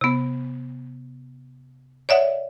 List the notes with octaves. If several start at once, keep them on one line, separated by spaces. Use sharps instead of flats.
C3 B3
C#5 D5 E5 F#5